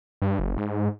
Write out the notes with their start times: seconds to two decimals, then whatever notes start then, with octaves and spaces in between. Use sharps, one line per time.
0.22 G2
0.39 F#1
0.57 G#2